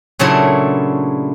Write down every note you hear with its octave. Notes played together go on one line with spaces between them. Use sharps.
A#2 C#3 F#3 A3 D4 E4